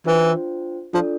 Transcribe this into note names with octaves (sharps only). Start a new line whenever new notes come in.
E3 D4 F4 C5 G5
F3 D4 F4 A4 D5